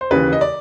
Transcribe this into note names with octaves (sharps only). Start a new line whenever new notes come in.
C5
D#2 C#3 E3 B4
D#5
D5